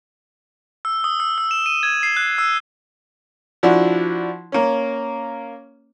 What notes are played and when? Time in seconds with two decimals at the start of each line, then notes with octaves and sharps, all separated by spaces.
0.85 E6
1.04 D#6
1.20 E6
1.38 E6
1.51 E7
1.66 D#7
1.83 G#6
2.03 C7
2.17 F#6
2.38 E6
3.63 F3 D4 E4 F#4
4.52 A#3 C#4